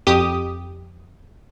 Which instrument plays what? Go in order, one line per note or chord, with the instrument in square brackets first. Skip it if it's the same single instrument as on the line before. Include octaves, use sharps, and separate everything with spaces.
[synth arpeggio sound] F2 G4 D#6